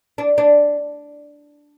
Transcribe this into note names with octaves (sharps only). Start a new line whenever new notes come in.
D4
D4